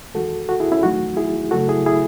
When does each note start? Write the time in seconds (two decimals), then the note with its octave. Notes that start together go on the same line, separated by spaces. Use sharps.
0.14 E2 D#3 G#3 F#4 A4
0.49 F#4 A4
0.60 E4 G#4
0.71 C#4 E4
0.83 E2 D#3 F#3 A3 D#4 F#4
1.17 E4 G#4
1.51 F#2 C#3 F#3 A3 F#4 A4
1.69 E4 G#4
1.86 E4 G#4